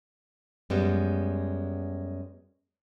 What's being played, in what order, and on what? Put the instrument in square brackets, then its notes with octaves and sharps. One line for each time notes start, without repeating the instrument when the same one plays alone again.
[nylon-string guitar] F#2 G3 G#3 B3